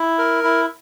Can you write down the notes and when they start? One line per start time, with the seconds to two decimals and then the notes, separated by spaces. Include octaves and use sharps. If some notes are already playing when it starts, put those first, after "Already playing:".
Already playing: E4
0.18 A#4
0.44 E4